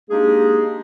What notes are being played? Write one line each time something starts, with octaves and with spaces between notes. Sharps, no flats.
G#3 A#3 D4 D#4 G4 G#4